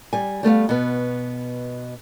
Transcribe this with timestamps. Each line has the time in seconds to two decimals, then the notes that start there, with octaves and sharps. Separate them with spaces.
0.13 G3 G#5
0.43 G3 A3 B3 F5
0.69 B2 B3